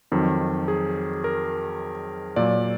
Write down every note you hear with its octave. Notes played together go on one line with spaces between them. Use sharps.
F2 D#3 F#3
G#4
A#4
A#2 F#3 D5